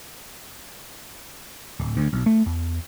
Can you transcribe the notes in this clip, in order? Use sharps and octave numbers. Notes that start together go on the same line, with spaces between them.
D1
D2
B1
A3
E2